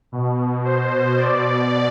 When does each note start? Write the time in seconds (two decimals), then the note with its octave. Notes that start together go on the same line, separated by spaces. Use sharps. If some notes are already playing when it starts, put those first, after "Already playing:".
0.12 B2
0.65 C5
1.18 B2 D5